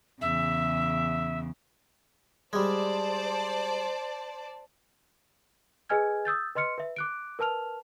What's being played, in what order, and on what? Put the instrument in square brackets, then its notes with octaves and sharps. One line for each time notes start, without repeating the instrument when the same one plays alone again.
[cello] E2 C#3 [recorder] E5
[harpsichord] G3 G#3 [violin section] C5 D5 A5
[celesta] G#4 B4 D#5 G#5 F6 G#6
D#6 E6 G6 A6
B4 D#5 C6 F6 C#7
B4 E5
D6 F#6 D7
A#4 B4 A5 F6 F7